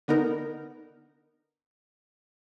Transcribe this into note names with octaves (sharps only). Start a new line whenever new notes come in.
D3 B3 D#4 A#4